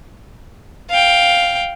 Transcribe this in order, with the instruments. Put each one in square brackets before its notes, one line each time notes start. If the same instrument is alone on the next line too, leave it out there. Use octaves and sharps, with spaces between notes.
[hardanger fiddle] F5 G5